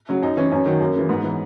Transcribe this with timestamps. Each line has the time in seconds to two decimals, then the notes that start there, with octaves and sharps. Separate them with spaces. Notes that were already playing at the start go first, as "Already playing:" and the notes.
0.09 C#3 F#3
0.22 F#2 D#4
0.37 E3 C#4
0.52 F#2 C#4
0.66 D#3 F#3
0.80 F#2 A#3
0.95 C#3 E3
1.09 G#2 B3
1.24 E3